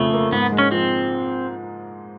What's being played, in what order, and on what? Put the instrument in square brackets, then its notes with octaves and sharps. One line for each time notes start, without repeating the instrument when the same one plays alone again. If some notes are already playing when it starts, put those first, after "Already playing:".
Already playing: [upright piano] F2 C#3 F3 [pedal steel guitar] A3
[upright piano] A#3
[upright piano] G#2 [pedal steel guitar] B3
[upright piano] G#3
[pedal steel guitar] C#4
[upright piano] F3 [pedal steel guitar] C4